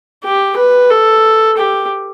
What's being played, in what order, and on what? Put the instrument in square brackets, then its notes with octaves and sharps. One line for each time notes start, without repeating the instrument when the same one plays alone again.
[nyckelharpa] G4
B4
A4
G4